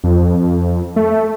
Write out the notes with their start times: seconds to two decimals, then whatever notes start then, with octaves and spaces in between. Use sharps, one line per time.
0.04 F2
0.96 A3